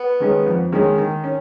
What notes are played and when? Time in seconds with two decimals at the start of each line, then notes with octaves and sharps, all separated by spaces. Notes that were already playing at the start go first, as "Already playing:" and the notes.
Already playing: B3
0.20 D#3 G#3 C#4
0.46 F2
0.72 D#3 G#3 C#4
0.98 D#3
1.24 C#4